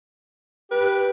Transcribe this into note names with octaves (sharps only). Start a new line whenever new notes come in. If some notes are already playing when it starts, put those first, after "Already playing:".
G4 B4